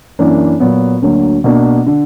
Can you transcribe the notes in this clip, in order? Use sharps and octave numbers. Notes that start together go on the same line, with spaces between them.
F#2 E3 A#3 D4
A#2 F#3 B3
D2 D3 F#3 A#3
B2 A#3 D4
D3